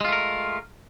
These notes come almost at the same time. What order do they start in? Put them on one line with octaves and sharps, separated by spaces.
G#3 F4 A3 A#4